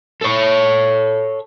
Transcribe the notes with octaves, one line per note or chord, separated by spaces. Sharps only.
A4 C#5